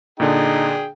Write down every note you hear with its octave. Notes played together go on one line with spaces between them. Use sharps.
A#2 D3 D4 D#4 G#4 G5